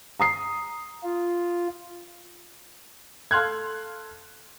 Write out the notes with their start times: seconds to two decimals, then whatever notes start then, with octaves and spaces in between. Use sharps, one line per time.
0.20 A#5 D#6 C7
1.03 F4
3.31 A4 F5 C6 F6 F#6 G#6